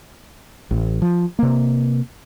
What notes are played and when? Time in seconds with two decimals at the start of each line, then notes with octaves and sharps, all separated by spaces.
0.71 A1
1.02 F3
1.39 C3 A#3